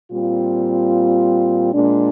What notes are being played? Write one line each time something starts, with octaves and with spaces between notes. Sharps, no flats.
A#2 G3 C4 F4
A#2 G#3 D4